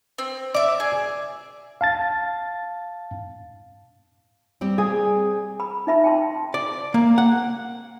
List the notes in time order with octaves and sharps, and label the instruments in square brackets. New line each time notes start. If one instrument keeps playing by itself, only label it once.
[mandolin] C4
[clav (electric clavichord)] D5 [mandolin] E5 D6
[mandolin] G#4
[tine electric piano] F5 A5 A6
[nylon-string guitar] G3 C4 G4
[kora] G#4 [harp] G#5
[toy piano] B5
D#4 E5 B5
G5 A5 C6
[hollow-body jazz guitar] D5
A#3
F#5